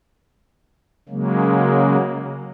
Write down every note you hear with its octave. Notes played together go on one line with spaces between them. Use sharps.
C#3 F#3 G#3 A#3